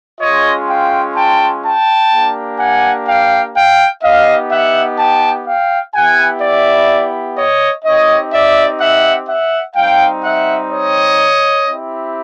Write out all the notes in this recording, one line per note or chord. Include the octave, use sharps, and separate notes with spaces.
G#3 C#4 F4 C#5 D#5
F5 G5
G5 A5
G5 A5
A#3 D4 G4
F#5 G#5
F5 G5
F5 G5
B3 D#4 G4 D#5 F5
E5 F#5
G5 A5
F5 G5
B3 E4 G4 F#5 G#5
D5 E5
C#5 D#5
C4 D#4 G4 C#5 D#5
D5 E5
E5 F#5
E5 F#5
G3 C4 D#4 F5 G5
E5 F#5
C#5 D#5
C4 E4 G4